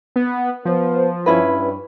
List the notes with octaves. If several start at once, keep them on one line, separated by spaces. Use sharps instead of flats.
B3
F3 B3 B4 C5
G2 C#4 E4 B4